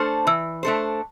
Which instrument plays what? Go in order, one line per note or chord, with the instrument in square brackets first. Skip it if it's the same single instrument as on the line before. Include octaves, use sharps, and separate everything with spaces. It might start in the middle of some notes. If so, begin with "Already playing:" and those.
Already playing: [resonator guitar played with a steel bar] A3 D4 A4 C5 [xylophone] F6
[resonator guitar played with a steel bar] E3 [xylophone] E6
[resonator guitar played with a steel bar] A3 D4 A4 C5